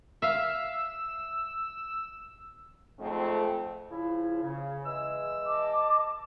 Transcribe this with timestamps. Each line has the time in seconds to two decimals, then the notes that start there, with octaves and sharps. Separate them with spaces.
0.22 E5 F5 E6
2.99 F2 G#2 A3 C4
3.91 C#3 F3 E4
4.43 C#3
4.86 E3 G#3 E6
5.44 D#5 A5 D6